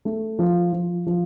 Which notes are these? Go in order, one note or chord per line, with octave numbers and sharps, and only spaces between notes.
A3
F3
F3
F3